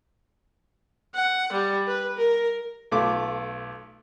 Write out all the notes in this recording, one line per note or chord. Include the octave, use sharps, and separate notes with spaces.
F#5
G3
B4
A#4
B1 A3 F4 D6